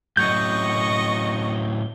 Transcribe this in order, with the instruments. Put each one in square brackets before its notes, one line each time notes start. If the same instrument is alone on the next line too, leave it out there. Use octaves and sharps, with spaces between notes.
[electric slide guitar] A2 F#3 C#4 [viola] D#5 C#6 [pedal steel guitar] G6